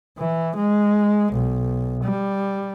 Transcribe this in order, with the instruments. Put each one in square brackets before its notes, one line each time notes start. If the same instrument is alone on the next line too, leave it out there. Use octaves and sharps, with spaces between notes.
[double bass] E3
G#3
B1
G3